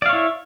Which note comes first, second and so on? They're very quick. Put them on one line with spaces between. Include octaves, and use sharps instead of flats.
D5 F5 C#5 E4